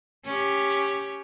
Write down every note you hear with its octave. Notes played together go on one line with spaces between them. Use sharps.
C#4 G4